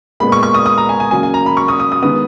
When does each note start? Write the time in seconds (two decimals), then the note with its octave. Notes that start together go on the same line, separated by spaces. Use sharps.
0.20 A#2 G#3 B3 B5
0.32 C#6
0.43 C#6
0.54 D#6
0.66 D#6
0.78 A#5
0.89 G#5
1.00 G#5
1.11 C#3 F#3 A#3 G#5
1.23 G#5
1.34 A#5
1.46 B5
1.57 C#6
1.68 D#6
1.80 D#6
1.92 D#6
2.02 D#3 G#3 B3 D#6